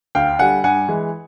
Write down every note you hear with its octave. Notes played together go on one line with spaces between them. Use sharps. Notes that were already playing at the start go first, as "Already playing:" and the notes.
D2 F5 G5
D3 G3 F#5 G#5
G2 F#5 G#5
E3 G#3